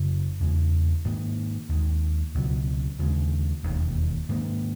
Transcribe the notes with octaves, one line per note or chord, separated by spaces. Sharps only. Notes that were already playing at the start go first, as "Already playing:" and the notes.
Already playing: F#2 C#3 F#3
E2 C#3 G#3
G#2 D#3 A#3
D#2 D#3 G#3
C#2 B2 F#3
D#2 C#3 E3 G#3
E1 D#2 D#3
G#2 D#3 A#3